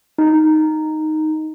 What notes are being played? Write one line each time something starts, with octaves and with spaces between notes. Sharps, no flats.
D#4